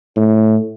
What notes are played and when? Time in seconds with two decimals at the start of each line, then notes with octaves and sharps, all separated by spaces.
0.16 A2